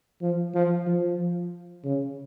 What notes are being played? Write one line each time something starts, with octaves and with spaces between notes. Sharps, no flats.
F3
F3
F3
C#3